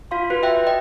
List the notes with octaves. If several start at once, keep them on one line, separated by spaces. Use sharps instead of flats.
F4 F5 C6
F#4 B4 F#6
E5 G5 F#6
D#5 G5